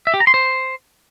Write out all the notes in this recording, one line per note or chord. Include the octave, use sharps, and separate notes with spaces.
E5
G4
A#5
C6
C5